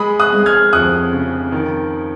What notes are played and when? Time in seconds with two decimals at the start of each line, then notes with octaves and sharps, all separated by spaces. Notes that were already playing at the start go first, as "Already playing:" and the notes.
Already playing: G#3 B5 D#6
0.20 D#6 F#6
0.33 G#3
0.46 F6 G#6
0.73 F2 D#6 F#6
1.13 C#3
1.52 D#3